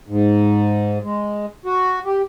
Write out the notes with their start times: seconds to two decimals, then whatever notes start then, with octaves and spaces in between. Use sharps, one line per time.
0.08 G#2
1.03 G#3
1.66 F#4
2.05 G4